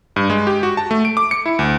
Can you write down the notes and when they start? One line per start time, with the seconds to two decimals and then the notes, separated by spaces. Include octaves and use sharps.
0.16 G2
0.30 G#3
0.47 G4
0.63 F#4
0.77 A5
0.91 A3
1.05 D7
1.17 D6
1.31 C#7
1.46 E4
1.59 D2